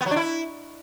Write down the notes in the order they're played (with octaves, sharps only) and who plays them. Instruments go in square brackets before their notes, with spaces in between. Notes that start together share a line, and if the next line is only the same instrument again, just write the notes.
[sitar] B3
F#3
D4
E4